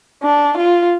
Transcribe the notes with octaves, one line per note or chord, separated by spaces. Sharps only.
D4
F4